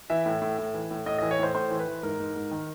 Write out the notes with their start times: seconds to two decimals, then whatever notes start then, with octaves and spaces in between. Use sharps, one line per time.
0.10 E3 E5
0.26 A2
0.42 A2
0.58 A2
0.74 E3
0.91 A2
1.06 A2 D#5
1.18 E3 D#5
1.31 C#5
1.39 A2 C5
1.55 A2 C5
1.71 E3
1.79 B4
1.87 E3
2.03 G#2 A#4
2.20 G#2
2.36 G#2
2.51 D#3